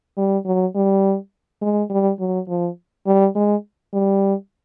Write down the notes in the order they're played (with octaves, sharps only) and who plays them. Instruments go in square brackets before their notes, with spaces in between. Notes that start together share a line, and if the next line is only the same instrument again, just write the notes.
[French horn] G3
F#3
G3
G#3
G3
F#3
F3
G3
G#3
G3